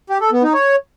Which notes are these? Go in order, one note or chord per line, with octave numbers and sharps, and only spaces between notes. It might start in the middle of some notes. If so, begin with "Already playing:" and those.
G4
A4
B3
D#4
C#5